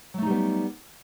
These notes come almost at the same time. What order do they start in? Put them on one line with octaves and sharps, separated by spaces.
F#3 A3 D#4 G3 B3